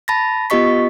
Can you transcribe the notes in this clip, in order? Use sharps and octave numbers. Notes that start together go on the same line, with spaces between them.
A5 B5 A6 A#6
B3 F4 G4 D#5 C#6 B6